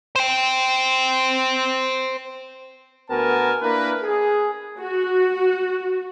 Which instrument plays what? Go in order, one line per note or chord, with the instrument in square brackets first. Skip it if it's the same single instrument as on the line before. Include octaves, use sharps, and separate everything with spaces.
[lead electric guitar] C5 G5
[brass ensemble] D2 B3 F#4 A#4 G#5 A5
A#3 D4 E4 A#4 B4
G#4
[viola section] F#4